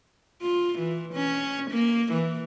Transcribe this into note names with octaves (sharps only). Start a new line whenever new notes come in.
F4
E3
C#4
A#3
E3